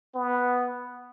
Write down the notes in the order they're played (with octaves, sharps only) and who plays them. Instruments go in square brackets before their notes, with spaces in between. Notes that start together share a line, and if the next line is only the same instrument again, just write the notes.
[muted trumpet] B3